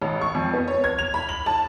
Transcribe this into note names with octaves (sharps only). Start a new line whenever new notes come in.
A1
C#6
F2
B3
C#5
G#6
F7
B5
F#7
A5